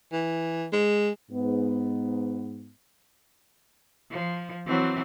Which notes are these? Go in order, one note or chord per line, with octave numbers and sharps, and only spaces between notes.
E3
G#3
G#2 B3
F3
E3 F#3 C4